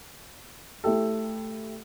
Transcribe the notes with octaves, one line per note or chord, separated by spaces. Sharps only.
A3 E4 G4 A4